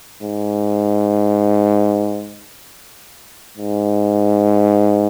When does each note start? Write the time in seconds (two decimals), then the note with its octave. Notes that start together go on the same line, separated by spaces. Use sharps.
0.23 G#2
3.58 G#2